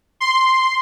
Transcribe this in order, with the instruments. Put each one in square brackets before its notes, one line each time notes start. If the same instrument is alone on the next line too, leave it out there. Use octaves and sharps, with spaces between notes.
[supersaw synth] C6